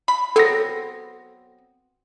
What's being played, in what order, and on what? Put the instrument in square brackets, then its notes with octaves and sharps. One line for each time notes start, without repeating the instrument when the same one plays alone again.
[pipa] B5
[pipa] F#3 B3 C4 [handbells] A4 A#6